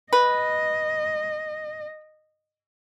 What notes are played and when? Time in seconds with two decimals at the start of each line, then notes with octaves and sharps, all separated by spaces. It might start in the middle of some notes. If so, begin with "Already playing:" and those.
0.13 B4 D#5